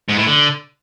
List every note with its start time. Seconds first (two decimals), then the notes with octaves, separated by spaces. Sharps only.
0.09 G#2
0.18 A2
0.27 D3